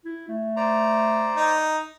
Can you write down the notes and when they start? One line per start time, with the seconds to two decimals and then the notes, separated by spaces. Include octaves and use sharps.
0.05 E4
0.28 A3
0.56 C5 D5 A#5
1.36 D#4